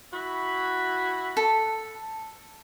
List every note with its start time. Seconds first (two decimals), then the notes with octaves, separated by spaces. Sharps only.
0.13 E4 F#4 B5
1.37 A4